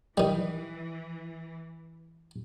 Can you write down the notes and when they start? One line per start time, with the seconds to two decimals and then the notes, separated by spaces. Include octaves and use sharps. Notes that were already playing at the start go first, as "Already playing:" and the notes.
0.18 D#3 E3 G3